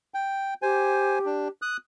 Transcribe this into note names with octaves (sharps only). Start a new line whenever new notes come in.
G5
G4 C5 G#5
D4
D#6 F#6